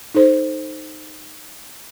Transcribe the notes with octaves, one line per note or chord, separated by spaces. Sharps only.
D#4 A4 C5